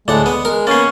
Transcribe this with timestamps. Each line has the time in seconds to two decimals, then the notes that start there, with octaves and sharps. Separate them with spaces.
0.08 D2 A2 G#3 D5 F#5
0.26 B3 D#6
0.45 G#3 A#4
0.67 A#3 B3 C#4 A6 C7